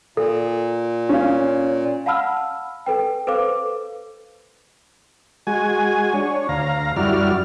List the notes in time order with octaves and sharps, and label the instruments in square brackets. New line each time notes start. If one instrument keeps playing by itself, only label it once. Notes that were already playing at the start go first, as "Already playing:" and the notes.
[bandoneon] A#2 [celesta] A4
[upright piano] C#4 F5
[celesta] F5 F#5 A5 B5 E6 F6
A4 B4 G5
A4 B4 C5 F5 D6
[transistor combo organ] G#3 F#4 G#5
D4 C#5
D2 F5 A#5
F#2 G3 E4 F#4 D5 F6